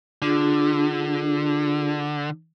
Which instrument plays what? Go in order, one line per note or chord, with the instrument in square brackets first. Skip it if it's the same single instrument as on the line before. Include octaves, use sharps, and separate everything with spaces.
[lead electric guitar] D3 [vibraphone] D4 F4 G#4